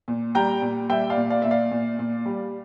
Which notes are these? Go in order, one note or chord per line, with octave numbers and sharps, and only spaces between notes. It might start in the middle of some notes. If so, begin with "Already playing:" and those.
A#2
G3 G5 A#5
A#2
G3 E5 G5
D5 F5
A#2
D5 F5
A#2 E5
D5 F5
A#2
A#2
G3